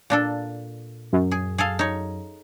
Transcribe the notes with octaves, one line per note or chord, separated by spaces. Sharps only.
A#2 D4 A4
F#2
G#4
G#4 A4 F5
D#4 C#5